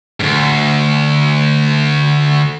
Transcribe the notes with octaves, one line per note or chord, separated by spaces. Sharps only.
D2 G#2